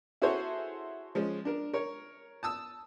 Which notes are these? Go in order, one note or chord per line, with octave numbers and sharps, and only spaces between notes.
E4 F#4 G#4 A4 C5 C#5
F3 G#3 C#4
D4 A#4
A#4 C#5
A5 D#6 E6